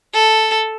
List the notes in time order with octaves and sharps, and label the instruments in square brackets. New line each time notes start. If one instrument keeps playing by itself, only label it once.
[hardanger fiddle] A4